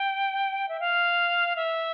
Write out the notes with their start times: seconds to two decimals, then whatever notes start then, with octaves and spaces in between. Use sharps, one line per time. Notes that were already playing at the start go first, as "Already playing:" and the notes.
Already playing: G5
0.69 E5
0.80 F5
1.56 E5